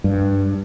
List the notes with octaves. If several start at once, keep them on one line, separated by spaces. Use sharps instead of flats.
G2